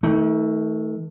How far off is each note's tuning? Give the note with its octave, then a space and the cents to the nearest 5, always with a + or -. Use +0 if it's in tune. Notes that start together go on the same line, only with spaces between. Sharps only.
D#3 +40 A3 +0